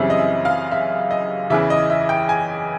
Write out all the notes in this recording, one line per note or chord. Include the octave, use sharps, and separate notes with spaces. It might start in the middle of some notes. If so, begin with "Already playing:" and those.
Already playing: F#2 C#3 E3 G3 C4 E5
D#5
E5
F5
E5
D#5
E2 C#3 E3 E5
D#5
E5
G5
G#5